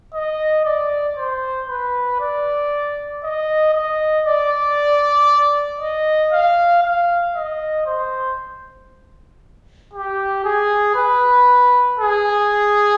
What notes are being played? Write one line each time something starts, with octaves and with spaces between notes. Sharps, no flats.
D#5
D5
C5
B4
D5
D#5
D#5
D5
D#5
F5
F5
D#5
C5
G4
G#4
B4
G#4